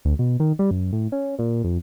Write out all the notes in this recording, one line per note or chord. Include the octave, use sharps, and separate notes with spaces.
D2
B2
D#3
G3
F#2
A2
C#4
A#2
F2